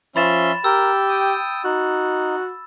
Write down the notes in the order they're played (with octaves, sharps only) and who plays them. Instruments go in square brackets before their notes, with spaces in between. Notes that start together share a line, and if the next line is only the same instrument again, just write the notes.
[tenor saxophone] F3 [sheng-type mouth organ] C#4 E5 C6 [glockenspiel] B5 A6 E7
[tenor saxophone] G4 [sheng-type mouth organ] A#4 [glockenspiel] E6
[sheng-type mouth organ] G5 D#6
[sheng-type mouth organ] D#4 [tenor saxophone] F#4